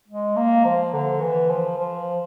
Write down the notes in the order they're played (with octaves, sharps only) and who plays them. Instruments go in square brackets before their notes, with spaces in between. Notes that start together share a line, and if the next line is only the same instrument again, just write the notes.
[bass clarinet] G#3
A#3
F3
D3
E3
F3
F3